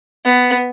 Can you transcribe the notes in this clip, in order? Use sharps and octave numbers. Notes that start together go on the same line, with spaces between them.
B3